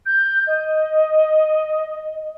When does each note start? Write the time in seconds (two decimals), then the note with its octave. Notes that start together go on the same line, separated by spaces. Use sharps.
0.05 G6
0.46 D#5